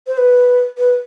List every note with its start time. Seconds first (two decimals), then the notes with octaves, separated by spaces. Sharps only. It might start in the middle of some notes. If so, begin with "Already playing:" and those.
0.07 C5
0.18 B4
0.78 B4